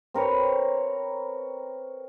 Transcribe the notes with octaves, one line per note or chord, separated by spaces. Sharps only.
C4 A#4 B4 C#5